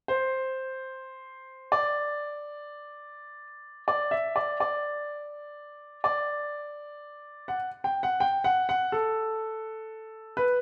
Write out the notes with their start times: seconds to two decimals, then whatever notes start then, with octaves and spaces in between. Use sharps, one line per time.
0.08 C5
1.72 D5
3.88 D5
4.11 E5
4.36 D5
4.60 D5
6.04 D5
7.48 F#5
7.84 G5
8.03 F#5
8.20 G5
8.44 F#5
8.69 F#5
8.92 A4
10.37 B4